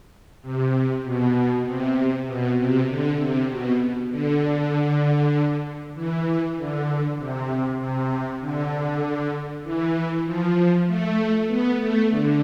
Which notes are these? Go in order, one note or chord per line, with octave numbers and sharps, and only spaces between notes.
C3
B2
C3
B2
C3
D3
C3
B2
D3
E3
D3
C3
C3
D3
E3
F3
A3
B3
A3
D3